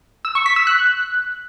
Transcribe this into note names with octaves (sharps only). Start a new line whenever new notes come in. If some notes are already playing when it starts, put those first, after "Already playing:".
E6
C#6
B6
E6
F#6